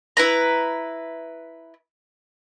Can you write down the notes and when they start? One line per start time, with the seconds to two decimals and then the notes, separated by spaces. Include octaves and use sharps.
0.17 E4 B4 A#5